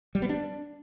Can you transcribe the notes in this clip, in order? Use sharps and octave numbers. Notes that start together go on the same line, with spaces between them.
G3
B3
D4